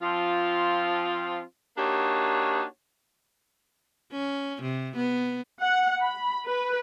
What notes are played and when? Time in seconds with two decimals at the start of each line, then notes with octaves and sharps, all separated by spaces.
0.02 F3 C4 F4
1.78 A#3 D4 D#4 F#4 G4 C#5
4.12 C#4
4.62 C3
4.96 B3
5.60 F#5
6.02 B5
6.46 B4